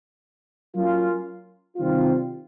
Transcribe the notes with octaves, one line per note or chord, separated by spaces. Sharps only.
F#3 A#3 C#4 F4
C3 D#3 G3 C4 F4